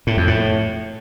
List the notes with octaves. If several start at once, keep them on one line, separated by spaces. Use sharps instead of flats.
A2
F2
A2